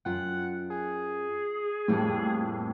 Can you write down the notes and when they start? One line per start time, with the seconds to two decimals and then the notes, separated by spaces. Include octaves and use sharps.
0.05 F#2 F4 F#5 G5
0.70 G#4
1.88 F2 A2 G3 A#3 C4